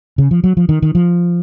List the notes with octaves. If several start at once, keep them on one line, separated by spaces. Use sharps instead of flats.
C#3
F3
F#3
F3
D#3
D#3
F3